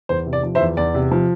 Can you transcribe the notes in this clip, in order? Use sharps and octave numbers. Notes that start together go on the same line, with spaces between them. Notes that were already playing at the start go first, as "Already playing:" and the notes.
E2 C5
C3
D5
F3
C5 E5
E2
E2 D5
C3
F3